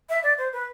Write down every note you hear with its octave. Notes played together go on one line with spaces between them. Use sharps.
E5
D5
C5
B4